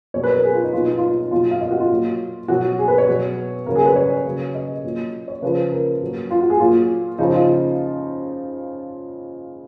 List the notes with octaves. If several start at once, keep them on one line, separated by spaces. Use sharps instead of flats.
B2 F#3 C#5
B4
A#4
G#4
F4
D#4
B2 F#3 F4
D#4
F4
D#4
B2 F#3 F4
F5
D#5
F#4
F4
A#2 F#3
B2 F#3 F#4
G#4
B4
C#5
B2 F#3
C#3 F#3 A#4
G#4
B4
C#5
C#3 F#3
D#5
A#2 F#3
C#5
C#3 F3 B4
A#4
A#2 F#3
F4
F#4
G#4
A#2 F#3 F4
C#3 F3 D#4
F4